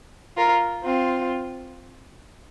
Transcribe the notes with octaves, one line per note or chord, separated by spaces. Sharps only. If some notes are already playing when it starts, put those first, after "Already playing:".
F4 A#4
C4 F4